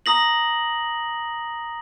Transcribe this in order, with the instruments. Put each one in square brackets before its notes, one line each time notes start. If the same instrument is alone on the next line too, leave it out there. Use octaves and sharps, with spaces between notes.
[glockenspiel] A#5 D#6 A#6 F#7